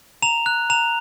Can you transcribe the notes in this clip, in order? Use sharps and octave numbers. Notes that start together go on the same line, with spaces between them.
A#5 F7
F#6
A#5 F7